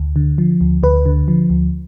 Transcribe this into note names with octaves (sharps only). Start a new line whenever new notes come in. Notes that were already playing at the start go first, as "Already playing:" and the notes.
Already playing: D2
D3
F3
D2
D2 B4
D3
F3
D2